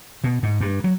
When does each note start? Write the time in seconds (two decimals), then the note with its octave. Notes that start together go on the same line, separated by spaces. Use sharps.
0.24 B2
0.43 G#2
0.61 G2
0.84 F#3